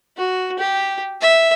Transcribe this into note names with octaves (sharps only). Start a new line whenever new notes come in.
F#4
G4
E5